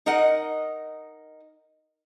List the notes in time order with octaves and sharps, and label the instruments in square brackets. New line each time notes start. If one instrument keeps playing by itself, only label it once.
[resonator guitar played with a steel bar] D#4 A#4 D#5 F#5